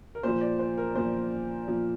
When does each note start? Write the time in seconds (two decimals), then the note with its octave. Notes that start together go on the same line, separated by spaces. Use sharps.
0.15 A#4
0.23 A#2 F3 C5
0.41 D5
0.59 C5
0.77 A#4
0.95 A#2 F3 C5
1.68 A#2 F3